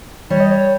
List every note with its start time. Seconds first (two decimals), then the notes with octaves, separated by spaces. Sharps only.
0.30 G3 C#5
0.40 D#5
0.51 C#5